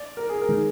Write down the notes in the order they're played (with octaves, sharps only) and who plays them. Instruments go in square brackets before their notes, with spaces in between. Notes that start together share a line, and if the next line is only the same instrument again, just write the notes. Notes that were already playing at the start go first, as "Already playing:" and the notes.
Already playing: [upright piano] D5
A#4
G#4
A#4
[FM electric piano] D#3 G#3